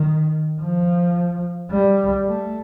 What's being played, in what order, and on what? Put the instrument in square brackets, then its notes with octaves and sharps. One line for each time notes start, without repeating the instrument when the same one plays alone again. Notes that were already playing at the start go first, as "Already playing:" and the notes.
Already playing: [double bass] D#3
F3
G3
A3